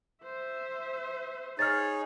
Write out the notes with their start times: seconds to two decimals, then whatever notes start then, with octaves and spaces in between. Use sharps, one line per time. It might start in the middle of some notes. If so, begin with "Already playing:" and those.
0.24 C5 E5
1.59 D#4 G#4 C#5 F6 A6